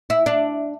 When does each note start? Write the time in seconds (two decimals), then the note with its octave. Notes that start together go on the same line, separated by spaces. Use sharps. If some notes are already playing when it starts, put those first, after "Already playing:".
0.10 E4
0.26 D4